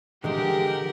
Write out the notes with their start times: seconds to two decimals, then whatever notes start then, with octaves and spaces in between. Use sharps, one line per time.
0.24 D3 E3 F3 G#3 G4 A#4 F#5